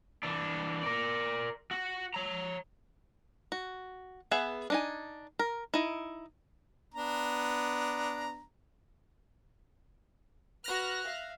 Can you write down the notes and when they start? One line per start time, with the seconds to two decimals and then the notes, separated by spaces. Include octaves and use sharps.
0.23 E3 D4
0.83 A#4 D5
1.71 F#4
2.14 C#5 A#5
3.52 F#4
4.31 B3 G#4 E5 F#5
4.70 D4 D#4 G#5
5.39 A#4
5.74 D#4 E4
6.94 B3 D4 A#5
10.64 F#4 B4 F6 F#6 A#6
11.04 E5 F5